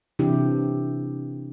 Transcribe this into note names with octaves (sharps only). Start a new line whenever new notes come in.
C3 E3 D4 E4 G4